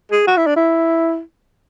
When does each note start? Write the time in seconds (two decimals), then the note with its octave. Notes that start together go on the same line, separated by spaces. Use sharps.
0.12 G#4
0.27 F#4
0.37 E4
0.47 D4
0.56 E4